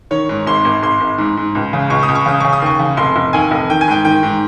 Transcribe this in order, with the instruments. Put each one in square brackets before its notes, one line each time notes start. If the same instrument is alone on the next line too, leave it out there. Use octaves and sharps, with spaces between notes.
[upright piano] D#3 C#5
G#2
G#1 C6
G#1
G#1 C6
G#1
G#2
G#2
C#2
C#3
C#2 C#6
D#6
C#2
C#6
C#3 D#6
C#3 C#6
D#6
D#2 C#6
C#3
F1 C6
F1
D#2 G#5
F1
D#3 G5
G#5
G#2 G5
D#3 G5
G#2